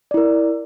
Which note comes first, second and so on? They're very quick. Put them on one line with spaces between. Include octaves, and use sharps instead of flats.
D5 E4 A#4